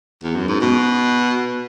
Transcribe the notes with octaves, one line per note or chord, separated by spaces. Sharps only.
E2
F#2
G#2
B2